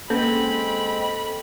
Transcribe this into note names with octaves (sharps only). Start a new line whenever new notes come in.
G#3 A#3 C4 C#4 A4 B4 B5